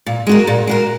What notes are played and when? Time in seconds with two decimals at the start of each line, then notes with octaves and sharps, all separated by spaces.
0.06 A#2
0.27 G#3 F#4 A#4
0.47 A#2
0.67 G#3 F#4 A#4